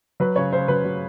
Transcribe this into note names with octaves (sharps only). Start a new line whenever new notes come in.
F#3 B4
C#3 C#5
C#3 C5
F#3 B4
F#3